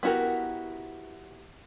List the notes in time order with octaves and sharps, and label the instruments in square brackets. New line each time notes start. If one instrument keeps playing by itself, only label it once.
[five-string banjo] B3 E4 F#4 G4 A#4